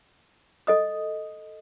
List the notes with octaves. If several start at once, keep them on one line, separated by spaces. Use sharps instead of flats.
A4 D#5 D#6